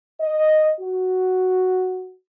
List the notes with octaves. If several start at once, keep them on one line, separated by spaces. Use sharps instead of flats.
D#5
F#4